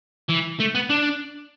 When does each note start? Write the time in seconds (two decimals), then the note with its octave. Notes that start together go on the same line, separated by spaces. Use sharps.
0.29 E3
0.60 A3
0.75 B3
0.89 D4